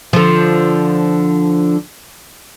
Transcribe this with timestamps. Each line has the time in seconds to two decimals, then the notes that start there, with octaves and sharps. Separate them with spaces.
0.13 D3 F3